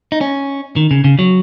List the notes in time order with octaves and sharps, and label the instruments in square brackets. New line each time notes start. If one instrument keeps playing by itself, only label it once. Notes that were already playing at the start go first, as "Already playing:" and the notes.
[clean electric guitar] D#4
C#4
D#3
C#3
C#3
F#3